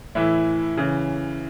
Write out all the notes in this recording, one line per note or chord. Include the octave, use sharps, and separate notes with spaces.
A2 E3 E4
C#3 E3